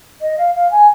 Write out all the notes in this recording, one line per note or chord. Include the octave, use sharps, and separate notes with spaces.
D#5
F5
F5
G#5